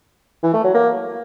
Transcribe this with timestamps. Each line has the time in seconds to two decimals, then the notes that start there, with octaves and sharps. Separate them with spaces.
0.43 E3
0.53 A3
0.64 F#3
0.74 A#3